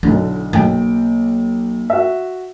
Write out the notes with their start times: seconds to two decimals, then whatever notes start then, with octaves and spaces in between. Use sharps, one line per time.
0.03 B1 D3 E4
0.53 B1 A#3 G5
1.90 F#4 E5